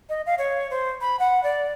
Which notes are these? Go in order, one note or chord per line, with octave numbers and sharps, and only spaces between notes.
D#5
F5
C#5
C5
B5
F#5
D5